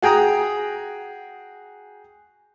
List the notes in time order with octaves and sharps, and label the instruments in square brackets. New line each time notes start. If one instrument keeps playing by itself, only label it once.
[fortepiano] F#4 G#4 G5 A#5 D#6